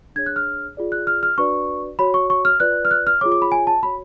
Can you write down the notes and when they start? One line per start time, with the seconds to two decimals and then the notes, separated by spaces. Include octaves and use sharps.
0.16 D4 G#4 C#5 G#6
0.26 F#6
0.36 F6
0.77 F4 G#4 D5
0.92 F#6
1.07 F6
1.23 F6
1.38 D4 F#4 B4 D5 C#6
1.99 F#4 C#5 B5
2.14 C#6
2.30 C#6
2.45 F6
2.60 F4 B4 D5 F#6
2.85 F6
2.91 F#6
3.07 F6
3.21 F4 G#4 C#5 D6
3.32 D6
3.42 B5
3.52 G#5
3.67 A5
3.83 F#4 C#5 B5